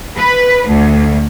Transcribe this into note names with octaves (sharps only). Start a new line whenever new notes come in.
B4
D2